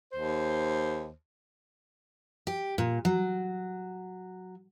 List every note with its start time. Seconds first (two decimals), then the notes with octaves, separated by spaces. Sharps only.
0.13 D#2 C5
2.47 G4
2.78 A#2
3.05 F#3